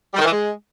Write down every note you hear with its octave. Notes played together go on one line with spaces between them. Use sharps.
G3
D#3
E3
G#3